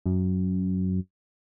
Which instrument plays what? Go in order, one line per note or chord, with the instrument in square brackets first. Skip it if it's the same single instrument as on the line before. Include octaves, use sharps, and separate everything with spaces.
[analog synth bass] F#2